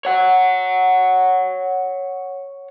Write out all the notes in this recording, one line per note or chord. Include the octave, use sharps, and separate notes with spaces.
C#5 F#5